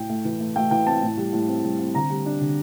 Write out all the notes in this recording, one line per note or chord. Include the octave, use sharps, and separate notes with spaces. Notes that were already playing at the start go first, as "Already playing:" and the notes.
Already playing: A2 G5
A3
E3
A3
A3 G5
E3 G5
C4 A5
A2
G3
A2
C4
G3
C4
D3 A#5
G3
D4
D3